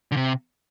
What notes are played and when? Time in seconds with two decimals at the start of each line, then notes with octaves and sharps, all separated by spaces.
0.12 D3
0.17 C3